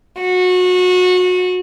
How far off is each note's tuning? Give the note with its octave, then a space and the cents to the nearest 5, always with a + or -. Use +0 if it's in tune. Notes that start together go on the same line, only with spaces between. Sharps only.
F#4 -25